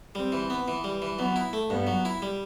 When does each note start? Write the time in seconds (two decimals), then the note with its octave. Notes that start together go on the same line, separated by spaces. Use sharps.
0.15 G3 C4
0.32 E3
0.50 B3
0.68 E3
0.84 G3
1.02 E3
1.19 F#3 B3
1.36 E4
1.53 A3
1.70 G2 B3
1.87 F#3
2.05 E4
2.22 G3